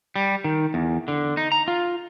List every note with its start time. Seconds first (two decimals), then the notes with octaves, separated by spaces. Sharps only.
0.16 G3
0.44 D#3
0.74 E2
1.08 D3
1.37 D#4
1.52 A#5
1.68 F4